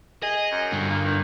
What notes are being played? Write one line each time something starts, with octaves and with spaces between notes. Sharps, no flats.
G#4 D#5
F#2
G2 D3
A#3
D#3